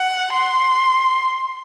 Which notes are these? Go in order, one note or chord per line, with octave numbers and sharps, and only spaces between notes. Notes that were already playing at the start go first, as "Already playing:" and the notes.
Already playing: F#5
C6